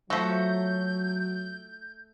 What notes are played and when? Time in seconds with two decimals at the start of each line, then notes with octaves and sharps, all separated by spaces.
0.10 F3 F#3 A3 F#4 A4 G6